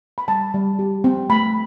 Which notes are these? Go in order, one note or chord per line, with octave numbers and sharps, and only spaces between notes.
B5
G3 A5
G3
G4
C4
A3 B5